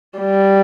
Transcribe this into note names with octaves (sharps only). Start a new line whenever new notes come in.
G3